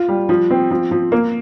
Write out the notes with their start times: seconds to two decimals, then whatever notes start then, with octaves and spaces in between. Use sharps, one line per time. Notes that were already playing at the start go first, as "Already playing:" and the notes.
Already playing: F4
0.08 G3
0.29 F3
0.50 C4
0.71 F3
0.91 F3
1.12 A#3